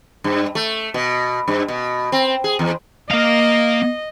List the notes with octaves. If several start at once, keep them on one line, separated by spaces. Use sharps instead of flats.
G2
A3
B2
G2
B2
C4
G#4
E2
A#3 D#5 F5